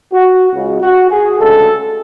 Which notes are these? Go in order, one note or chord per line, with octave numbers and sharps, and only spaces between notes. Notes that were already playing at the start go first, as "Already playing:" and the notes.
F#4
C#2 C#3 G#3
F#4
G#4
D2 C#3 G#3 A4